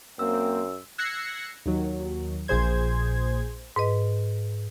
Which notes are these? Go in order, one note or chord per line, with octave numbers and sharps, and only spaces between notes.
F#2 A#3 C4 E6
E6 F#6 G#6 A#6 C7 C#7
D#2 D#3 F#3
A#1 A#2 G#4 C5 G#6
G#2 B4 D#5